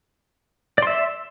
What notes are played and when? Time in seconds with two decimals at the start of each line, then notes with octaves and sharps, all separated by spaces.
0.78 D5
0.82 C6
0.87 E5